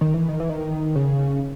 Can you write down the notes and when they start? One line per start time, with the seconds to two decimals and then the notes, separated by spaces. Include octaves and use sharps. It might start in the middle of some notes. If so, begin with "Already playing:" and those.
0.01 D#3
0.14 E3
0.28 D#3
0.40 E3
0.49 D#3
0.96 C#3